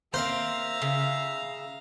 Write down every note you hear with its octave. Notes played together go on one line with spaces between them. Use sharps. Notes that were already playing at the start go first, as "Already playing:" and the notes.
A#3 C4 C5 E5 F5 A#5
C#3